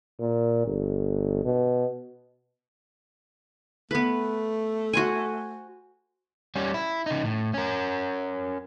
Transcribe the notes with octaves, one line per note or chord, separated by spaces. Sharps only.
A#2
G1
B2
A3 B3 B4
F#4 C5 G#5
G3 C#4
E4
C#3 D#4
A2
C#4 A#4